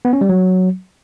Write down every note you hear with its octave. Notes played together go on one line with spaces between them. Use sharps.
B3
C#4
G3
F#3